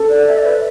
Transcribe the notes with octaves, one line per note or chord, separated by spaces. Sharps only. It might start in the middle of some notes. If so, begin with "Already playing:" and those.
Already playing: A4
D5
E5
D5
B4